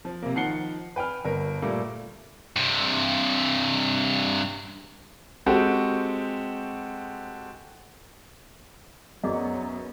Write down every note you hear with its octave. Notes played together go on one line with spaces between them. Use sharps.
F3
C3 A#3
D#3 F3 F#5 C7 C#7 G7
B4 G5 G#5 F6
G1 A#4
A#2 G3 A3 A#3
G2 C3
G#3 C4 F#4 G4 A4
F#2 F#3 B3 C#4 G#4 D5 D#5